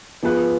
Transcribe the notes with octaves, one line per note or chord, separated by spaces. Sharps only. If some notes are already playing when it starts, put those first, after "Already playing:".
F3 B3 F4 G#4 B4